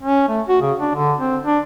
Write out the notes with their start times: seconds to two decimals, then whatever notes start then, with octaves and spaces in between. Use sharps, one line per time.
0.03 C#4
0.28 A3
0.48 F#4
0.61 C#3
0.79 D4
0.95 D3
1.18 C4
1.45 D4